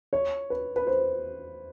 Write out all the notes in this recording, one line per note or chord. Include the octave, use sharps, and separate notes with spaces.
C#5
B4
B4
C5